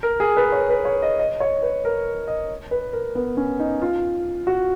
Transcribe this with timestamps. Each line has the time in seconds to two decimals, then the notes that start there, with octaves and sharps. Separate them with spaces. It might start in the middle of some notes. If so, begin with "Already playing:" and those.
0.03 A#4
0.20 G#4
0.37 B4
0.52 C#5
0.70 B4
0.85 C#5
1.02 D#5
1.19 D#5
1.40 C#5
1.62 B4
1.85 A#4
2.27 D#5
2.71 B4
2.93 A#4
3.15 B3
3.37 C#4
3.60 D#4
3.82 F4
4.47 F#4